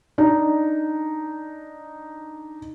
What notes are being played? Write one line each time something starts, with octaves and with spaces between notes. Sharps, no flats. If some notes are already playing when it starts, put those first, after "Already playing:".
D4 D#4